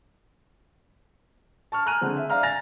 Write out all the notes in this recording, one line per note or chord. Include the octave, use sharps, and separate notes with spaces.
A5 C#6 F6
G#5 A#5 F6 F#6 D#7
D3 G#3 C4
E5
D5 F5 A#5 F6
G#5 A#5 A6 A#6 F7